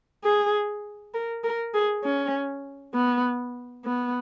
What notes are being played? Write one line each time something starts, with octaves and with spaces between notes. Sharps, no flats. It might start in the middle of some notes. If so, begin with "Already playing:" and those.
G#4
A#4
A#4
G#4
C#4
B3
B3